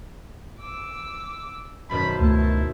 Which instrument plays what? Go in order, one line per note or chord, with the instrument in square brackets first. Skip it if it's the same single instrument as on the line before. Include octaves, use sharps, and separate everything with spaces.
[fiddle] D6 E6
[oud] F#2 B2 D#3 [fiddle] C5 A5 [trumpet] B5
[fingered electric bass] C#2 A3 [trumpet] E4